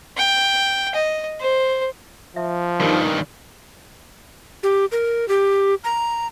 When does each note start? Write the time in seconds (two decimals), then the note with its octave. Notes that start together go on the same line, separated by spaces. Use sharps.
0.17 G5
0.95 D#5
1.40 C5
2.36 F3 E5
2.80 G2 D#3 D#4 G4 A#4
4.63 G4
4.92 A#4
5.28 G4
5.84 A#5